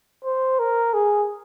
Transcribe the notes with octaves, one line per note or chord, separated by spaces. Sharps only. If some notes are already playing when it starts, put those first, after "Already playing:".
C5
A#4
G#4